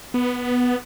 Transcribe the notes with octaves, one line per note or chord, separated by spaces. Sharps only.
B3